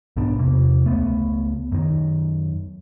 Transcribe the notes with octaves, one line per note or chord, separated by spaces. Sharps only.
B1 G#2 B3 D4
E2 C3 A#3
C#2 A3 B3
F#2 D#3